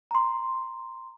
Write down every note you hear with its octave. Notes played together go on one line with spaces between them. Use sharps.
A#5 C6